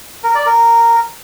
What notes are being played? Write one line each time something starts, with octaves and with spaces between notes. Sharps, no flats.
A#4
D5
A#4